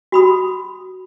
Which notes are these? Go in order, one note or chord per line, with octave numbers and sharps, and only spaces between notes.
F#4 B5 D#6